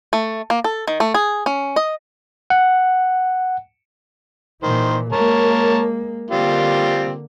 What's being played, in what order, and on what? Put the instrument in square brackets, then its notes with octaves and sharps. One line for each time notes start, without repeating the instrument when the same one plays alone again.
[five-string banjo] A3
A#3
A4
D#3
A3
G#4
C#4
D#5
[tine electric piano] F#5
[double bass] A#2 E3 [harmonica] D#3 C5
[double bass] G#3 A#3 [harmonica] A#4 C#5 A5
[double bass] D3 A#3 [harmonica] G3 C4 F4